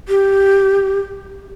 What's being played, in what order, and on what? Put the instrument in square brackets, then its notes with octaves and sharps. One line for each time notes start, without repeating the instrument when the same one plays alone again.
[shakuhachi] G4